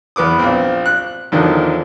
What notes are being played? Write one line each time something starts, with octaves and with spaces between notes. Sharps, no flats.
E2 B3 D6 D#6
A#1 C4
F#6
E2 D3 D#3 F3 F#3